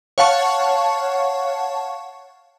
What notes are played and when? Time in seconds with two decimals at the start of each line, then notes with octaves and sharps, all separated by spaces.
0.18 C#5 F5 F#5 A5 C#6